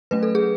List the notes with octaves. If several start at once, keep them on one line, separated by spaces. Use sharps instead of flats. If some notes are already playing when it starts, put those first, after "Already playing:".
F#3 A3 C#4 B4
A4
G#4